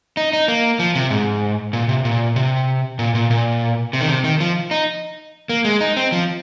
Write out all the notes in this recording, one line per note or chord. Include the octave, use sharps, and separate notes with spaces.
D#4
D#4
A#3
F3
C3
G#2
A#2
C3
A#2
C3
A#2
A#2
A#2
C3
D#3
C3
D#3
F3
D#4
A#3
G#3
D#4
C4
F3